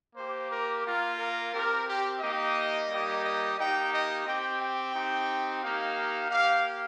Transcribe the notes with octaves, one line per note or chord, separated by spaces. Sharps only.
A#3 G4 C5
A#4
A#3 F4 A#4
A#4
C4 G4 A#4
G4
A#3 D#4 G4 D#5
G3 A#3 D#4 G4
D#5
A#3 D#4 G4 G5
D#5
C4 G4 G5
G5
C4 D#4 G4
A#3 D#4 G4 F5
A#3 G4 F5